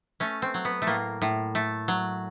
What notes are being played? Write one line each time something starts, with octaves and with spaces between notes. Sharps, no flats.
A3 C#4
C4
F#3
B3
A3
A2 A#3
A2
A3
F#3